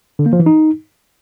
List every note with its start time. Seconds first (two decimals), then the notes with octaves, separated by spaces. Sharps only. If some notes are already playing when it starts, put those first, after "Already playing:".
0.19 D3
0.26 A#3
0.33 F3
0.40 E3
0.46 D#4